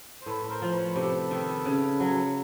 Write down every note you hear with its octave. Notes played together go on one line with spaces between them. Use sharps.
C5
A2 A4 B4
A#4 C5
F3
B4 C#5
C3 A4 B4
D#3
C#3
F#3